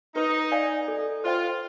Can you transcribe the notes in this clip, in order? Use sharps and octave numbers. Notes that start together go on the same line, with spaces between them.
D#4 B4
D5 F5 G#5
A4
F4 C5 D#5 G5